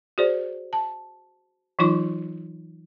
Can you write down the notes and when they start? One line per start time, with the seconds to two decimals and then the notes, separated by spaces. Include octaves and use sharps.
0.18 F#4 G#4 C5 D5
0.73 A5
1.79 E3 F#3 D#4 F4 C6 C#6